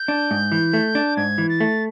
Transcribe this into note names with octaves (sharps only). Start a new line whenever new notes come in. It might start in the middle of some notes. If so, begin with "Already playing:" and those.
Already playing: G6
D4
G#2
E3
A3
D4
G#2 G#6
E3
A6
A3